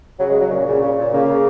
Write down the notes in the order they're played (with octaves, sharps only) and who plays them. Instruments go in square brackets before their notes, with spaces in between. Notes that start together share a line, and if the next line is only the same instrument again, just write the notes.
[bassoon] C#3 [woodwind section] F#3
[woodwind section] G#3
F#3
[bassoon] A#2 [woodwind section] C#3
[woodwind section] C#3
C#3
A#2
[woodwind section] C#3 [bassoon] A#3